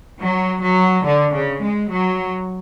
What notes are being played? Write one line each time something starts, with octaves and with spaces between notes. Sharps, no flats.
F#3
F#3
D3
C#3
G#3
F#3